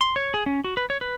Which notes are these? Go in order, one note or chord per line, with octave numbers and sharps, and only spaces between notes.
C6
C#5
G#4
C#4
F#4
B4
C#5
B4